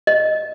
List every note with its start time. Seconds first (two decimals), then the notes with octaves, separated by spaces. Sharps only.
0.07 D#5